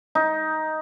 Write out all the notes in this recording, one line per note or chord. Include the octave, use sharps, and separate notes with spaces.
D#4